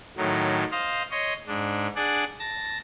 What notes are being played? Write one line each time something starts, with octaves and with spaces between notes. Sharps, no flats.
A2 D#3 F#3
C5 D#5 F5
C#5 D#5 C6
G#2 D4
D4 G#4 D5 F#5
A5 A#6